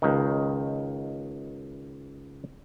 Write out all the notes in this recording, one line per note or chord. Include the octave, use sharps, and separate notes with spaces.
C#2 D#3